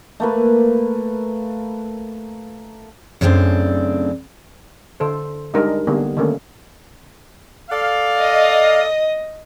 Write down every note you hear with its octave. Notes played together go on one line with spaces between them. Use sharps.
A3 A#3 B4
F#2 A2 C#3 A#3 C4 D4
D3 A4 C5
G3 G#3 D4 D#4 A#4
D3 G3 A#3 B3 G#4
D3 D#3 A3 A#3 C#4
A4 D5 F5
D#5